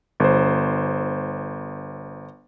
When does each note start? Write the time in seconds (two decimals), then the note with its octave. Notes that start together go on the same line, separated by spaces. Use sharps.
0.20 G1 C5